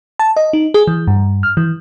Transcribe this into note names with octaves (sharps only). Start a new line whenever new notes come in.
A5
D#5
D#4
G#4
E3
G2
F6
E3